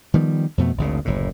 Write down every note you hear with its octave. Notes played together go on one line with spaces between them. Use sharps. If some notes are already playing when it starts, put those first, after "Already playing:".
D#3 F3 G3 B3
F2 B2 A3
G#1 D2 C#3
F#1 D2 A2